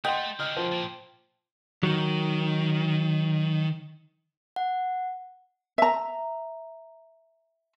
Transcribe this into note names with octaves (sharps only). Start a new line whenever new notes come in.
A3 D#5 F#5 G5 C6
D3 C#4 D#5 F6
F3
A#2
D#3 F#3
F#5
E5 A#5